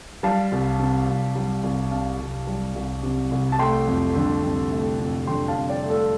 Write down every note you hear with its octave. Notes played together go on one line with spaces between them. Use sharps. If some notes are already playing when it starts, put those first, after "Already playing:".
G3 F5 A5
C2
C3
C2
G3
C2
C3 F5 A5
C2
G3
C2
C3
C2
A5
A3 G5 C6
F2
D3
F2
A3
F2
D3 G5 C6
F5 A5
F2
D5 G5
A3
A4 D5